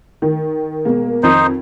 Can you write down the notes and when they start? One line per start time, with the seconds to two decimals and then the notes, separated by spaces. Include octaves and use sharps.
0.22 D#3
0.85 B2 G#3 A#3
1.23 F2 D#3 D#4 C5